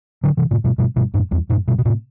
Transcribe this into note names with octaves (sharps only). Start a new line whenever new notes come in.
D3 F#3
C3 E3
A2 C3
G2 B2
G2 B2
G2 B2
F#2 A2
E2 G2
F#2 A2
G2 B2
B2
A2 C3